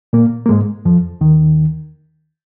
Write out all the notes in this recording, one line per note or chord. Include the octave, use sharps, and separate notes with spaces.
A#2 A#3
A#3
G#2 G#3
F2 F3
D#2 D#3